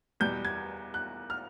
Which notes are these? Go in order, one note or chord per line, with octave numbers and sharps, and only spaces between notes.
E2 B2 G3 G6
G#6
F#6
F6